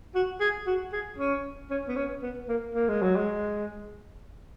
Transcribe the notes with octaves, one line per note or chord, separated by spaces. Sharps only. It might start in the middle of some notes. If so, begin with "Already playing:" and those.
F#4
G#4
F#4
G#4
C#4
C#4
B3
C#4
B3
A#3
A#3
G#3
F#3
G#3